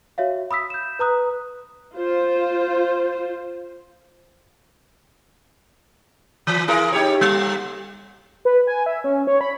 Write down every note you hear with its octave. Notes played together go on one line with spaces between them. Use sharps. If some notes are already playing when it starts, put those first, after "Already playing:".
F#4 C#5 E5 F5
B5 D#6 E6 B6
G6 E7
B4 A#5 D#6 F#6
F4 C5
E3
E4 G#4 A#4
D#4 G4 C#5
G3
B4
G#5
E5
C#4
C#5
B5